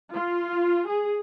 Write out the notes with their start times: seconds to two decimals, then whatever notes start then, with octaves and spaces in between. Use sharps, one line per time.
0.12 F4
0.88 G#4